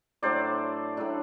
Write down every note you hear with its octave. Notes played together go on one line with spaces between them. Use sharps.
A2 F#3 A3 D4 C5 D5
A2 F#3 A3 D4